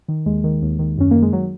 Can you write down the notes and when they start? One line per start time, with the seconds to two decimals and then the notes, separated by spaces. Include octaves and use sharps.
0.08 D#3
0.26 D#2 G#3
0.44 D#3
0.62 D#2
0.79 D#3
0.98 F#2 C#4
1.11 D#3 A#3
1.22 G#3
1.33 F#3